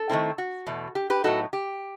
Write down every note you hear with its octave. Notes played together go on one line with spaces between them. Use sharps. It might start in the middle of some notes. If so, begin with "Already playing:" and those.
Already playing: A4
D#3 A3 C4 E4
F#4
E2 B2 A3
G4
G4 B4
A2 F#3 B3 D#4 F#4 A4
G4